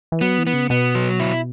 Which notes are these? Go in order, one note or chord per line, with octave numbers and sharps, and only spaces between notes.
E3
F#3 B3
E3
B3
C#3
B2 B3
F#3
E4